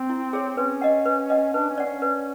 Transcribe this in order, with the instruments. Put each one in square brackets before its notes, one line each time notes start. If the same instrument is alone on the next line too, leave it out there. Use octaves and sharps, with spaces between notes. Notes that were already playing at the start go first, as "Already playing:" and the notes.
Already playing: [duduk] C4
[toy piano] E4
G#4 C#5
[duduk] C#4 [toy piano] B4
[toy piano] D#5 F#5
B4
D#5 F#5
[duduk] D4 [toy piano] B4
[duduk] C#4
[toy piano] D5 F#5
[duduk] C#4
[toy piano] B4